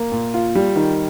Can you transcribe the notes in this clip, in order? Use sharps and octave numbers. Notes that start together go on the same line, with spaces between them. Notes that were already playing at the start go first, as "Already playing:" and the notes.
Already playing: A#3
A#2
F4
G3
D#3